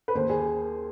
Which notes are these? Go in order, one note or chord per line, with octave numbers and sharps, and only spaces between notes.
B4
D#2 C5
G#4